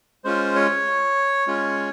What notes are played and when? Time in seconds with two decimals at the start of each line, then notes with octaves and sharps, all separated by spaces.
0.24 G#3 C#4 F4 C5
0.56 C#5
1.47 G#3 C#4 F4